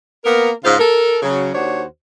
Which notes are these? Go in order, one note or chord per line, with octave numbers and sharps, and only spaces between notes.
A#3 B3 A#4
G#2 C#3 F4 C5 F5
A4 A#4
C#3 F#3
D#2 D4 F#4 C5 C#5